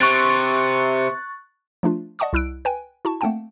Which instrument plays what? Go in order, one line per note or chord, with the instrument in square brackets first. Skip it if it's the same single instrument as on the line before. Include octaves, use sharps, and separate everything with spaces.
[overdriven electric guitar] C3 [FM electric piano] C#6 F#6 A6
[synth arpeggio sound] F3 A3 D4 F4
D5 D#5 F#5 A5 C#6 D#6
C2 E4 E6 F#6 D7
B4 G5 G#5
E4 F#4 A5 C#6
A3 A#3 C4 F#5 G5 A5